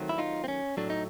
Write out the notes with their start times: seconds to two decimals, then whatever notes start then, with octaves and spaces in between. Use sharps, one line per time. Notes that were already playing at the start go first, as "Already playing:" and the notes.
Already playing: D#3 F#3 A3 C4
0.09 E4
0.18 D#4 F4
0.44 C4
0.48 C#4
0.77 A2 F#3 A3 D4
0.90 D#4